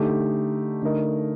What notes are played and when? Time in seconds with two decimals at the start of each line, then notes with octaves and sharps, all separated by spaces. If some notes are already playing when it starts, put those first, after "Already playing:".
Already playing: D3 A3 D#4 G4
0.83 D3 A3 D#4 A#4 D#5